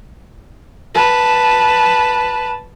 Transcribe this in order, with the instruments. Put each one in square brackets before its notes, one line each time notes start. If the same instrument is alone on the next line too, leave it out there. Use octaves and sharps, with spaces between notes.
[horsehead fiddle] B4 A5